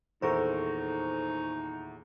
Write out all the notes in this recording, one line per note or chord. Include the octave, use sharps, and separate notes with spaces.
D#1 E2 D#4 A4 A#4 C5 C#6